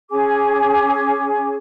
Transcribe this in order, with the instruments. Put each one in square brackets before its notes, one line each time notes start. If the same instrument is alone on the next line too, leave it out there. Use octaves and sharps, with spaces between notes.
[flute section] C#4 G#4 G#5 D6